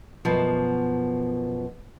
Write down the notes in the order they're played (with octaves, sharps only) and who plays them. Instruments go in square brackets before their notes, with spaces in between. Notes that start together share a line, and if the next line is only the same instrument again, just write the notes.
[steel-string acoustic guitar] F#2 B2 F3